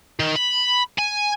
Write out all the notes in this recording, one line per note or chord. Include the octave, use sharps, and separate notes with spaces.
D#3
B5
G#5